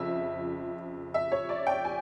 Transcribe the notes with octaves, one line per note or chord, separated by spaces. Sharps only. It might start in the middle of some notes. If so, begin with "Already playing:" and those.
Already playing: F2 C#3 F3 E5
E5
C#5
D5
G5
G#5